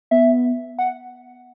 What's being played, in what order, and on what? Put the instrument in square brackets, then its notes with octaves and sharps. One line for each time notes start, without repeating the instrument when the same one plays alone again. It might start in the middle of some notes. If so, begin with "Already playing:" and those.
[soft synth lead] B3 [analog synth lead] E5
[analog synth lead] F#5